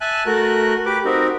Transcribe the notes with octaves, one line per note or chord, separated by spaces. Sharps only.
E5 G#5 A5 F#6
A3 F#4 A#4 F#6
G4 B4 D6
C4 D#4 F#4 A#4